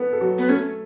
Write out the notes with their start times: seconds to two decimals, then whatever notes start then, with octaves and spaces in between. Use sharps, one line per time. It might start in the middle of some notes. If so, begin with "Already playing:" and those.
Already playing: B3 A4 B4
0.13 A4
0.21 F#3 F#4
0.38 B3
0.49 A3 C#4 A4